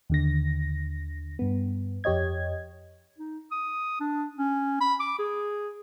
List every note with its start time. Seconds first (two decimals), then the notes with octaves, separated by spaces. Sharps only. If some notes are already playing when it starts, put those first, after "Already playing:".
0.10 D#2 D3 A#6
1.39 G2 B3
2.04 F2 G4 C#5 D#5 G#6
3.18 D#4
3.52 D#6
4.00 D4
4.38 C#4
4.81 B5
5.00 D6
5.19 G#4